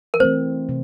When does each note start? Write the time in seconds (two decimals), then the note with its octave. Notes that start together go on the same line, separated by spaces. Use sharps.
0.14 A#4
0.20 E3 A3 C4 C5
0.69 C3